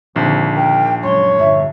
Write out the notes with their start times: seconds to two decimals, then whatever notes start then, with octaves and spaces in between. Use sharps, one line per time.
0.16 A#1 D#2 D3 C4 D#4
0.56 A#4 G5
1.03 C#2 F#2 C#5 C6
1.39 G1 E5